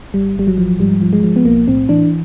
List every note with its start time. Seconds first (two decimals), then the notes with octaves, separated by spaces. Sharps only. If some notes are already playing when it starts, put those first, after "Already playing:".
0.14 G#1 G3
0.37 G#1 G3
0.47 F#3
0.58 F3
0.80 G#2 G3
1.01 F3
1.13 G#3
1.24 F3
1.36 B3
1.45 B1 A#3
1.68 A2 C4
1.89 E3 D4